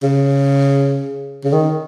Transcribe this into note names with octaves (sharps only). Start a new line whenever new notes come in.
C#3
C#3
D#3